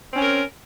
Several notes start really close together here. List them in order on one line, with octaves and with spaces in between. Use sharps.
C4 C#4 A#4